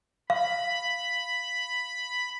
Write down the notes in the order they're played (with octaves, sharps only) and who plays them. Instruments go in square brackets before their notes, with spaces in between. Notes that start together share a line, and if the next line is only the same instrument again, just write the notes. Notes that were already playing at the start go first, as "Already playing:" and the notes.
[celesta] F5 [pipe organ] B5